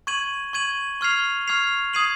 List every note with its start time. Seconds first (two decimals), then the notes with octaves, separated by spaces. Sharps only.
0.07 C#6 G#6 D#7 F#7
0.53 C#6 G#6 D#7 F#7
1.01 C#6 F6 G#6 C7 F7
1.47 C#6 F6 G#6 C7 F7
1.93 D#6 G#6 C7 D#7 F#7